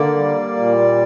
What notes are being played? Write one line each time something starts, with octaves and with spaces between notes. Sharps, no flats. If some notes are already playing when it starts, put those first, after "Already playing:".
Already playing: D3 A#3 D5
G3
A#2